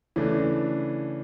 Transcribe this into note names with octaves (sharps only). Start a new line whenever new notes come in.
C#3 E3 A3 D4